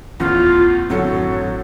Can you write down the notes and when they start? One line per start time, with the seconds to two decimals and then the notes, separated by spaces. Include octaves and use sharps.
0.20 D1 G#1 E2 A2 C#4 F4
0.90 G#1 F#2 A2 D3 F#3 C4 A4